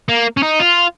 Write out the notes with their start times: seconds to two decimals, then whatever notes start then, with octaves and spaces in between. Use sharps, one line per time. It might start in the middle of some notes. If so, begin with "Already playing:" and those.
0.09 A#3
0.37 C#4
0.43 D#4
0.60 F4